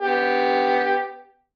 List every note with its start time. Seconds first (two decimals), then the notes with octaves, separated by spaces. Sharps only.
0.01 B3 G4